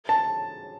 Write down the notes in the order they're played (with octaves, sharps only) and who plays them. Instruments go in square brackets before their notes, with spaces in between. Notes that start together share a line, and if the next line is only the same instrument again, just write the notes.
[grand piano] A5